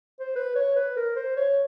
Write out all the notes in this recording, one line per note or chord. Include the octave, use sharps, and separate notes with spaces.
C5
B4
C#5
B4
A#4
C5
C#5